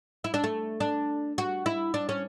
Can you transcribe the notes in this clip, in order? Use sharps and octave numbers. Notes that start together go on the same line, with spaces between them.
E4
D4
A3
D4
F#4
E4
D4
C#4